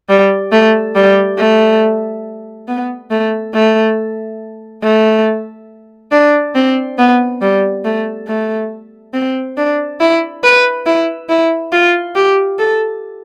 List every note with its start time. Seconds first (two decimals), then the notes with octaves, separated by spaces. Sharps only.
0.09 G3
0.52 A3
0.95 G3
1.38 A3
2.67 B3
3.11 A3
3.54 A3
4.83 A3
6.12 D4
6.55 C4
6.98 B3
7.41 G3
7.84 A3
8.27 A3
9.14 C4
9.57 D4
10.00 E4
10.43 B4
10.86 E4
11.29 E4
11.72 F4
12.15 G4
12.59 A4